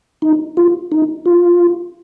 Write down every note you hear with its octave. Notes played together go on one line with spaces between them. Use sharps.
D#4
F4
D#4
F4